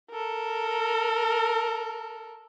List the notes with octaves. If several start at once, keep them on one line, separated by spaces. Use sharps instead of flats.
A4 A#4